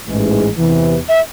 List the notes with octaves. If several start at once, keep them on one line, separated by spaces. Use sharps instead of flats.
A1 G#2 E3 G#3
E2 C3 E3
E5